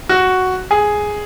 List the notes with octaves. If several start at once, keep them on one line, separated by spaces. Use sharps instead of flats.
F#4
G#4